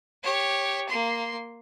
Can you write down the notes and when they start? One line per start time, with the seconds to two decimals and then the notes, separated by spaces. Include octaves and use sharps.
0.23 G4 C#5
0.89 A#3 C6